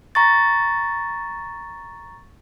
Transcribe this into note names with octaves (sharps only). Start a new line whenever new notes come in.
A#5 C#6 A6